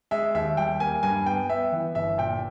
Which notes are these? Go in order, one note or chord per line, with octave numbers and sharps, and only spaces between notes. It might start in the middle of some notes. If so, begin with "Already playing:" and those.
G#3 E5
D#2 E5
G3 G5
A#3 G#5
G2 G#5
B3 G5
B3 E5
E3
G1 E5
A#2 G5